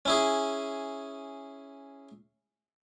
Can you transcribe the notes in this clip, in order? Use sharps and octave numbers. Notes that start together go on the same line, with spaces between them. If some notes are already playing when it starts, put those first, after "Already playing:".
C#4 E4 G#4